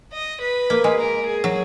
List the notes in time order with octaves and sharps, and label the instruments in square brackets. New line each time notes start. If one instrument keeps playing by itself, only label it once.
[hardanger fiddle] D#5
B4
[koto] A#3
G#3
[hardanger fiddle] A#4
G#4
[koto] F#3